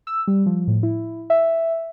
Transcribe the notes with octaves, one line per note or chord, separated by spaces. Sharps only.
E6
G3
F3
A2
E4
E5